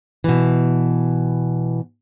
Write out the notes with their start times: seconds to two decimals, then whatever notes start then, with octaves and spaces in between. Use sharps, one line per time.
0.24 B2 E3